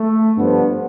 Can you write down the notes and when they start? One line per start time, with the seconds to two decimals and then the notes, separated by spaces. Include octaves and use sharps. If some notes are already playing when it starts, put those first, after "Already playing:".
Already playing: A3
0.37 G2 D3 F3 B3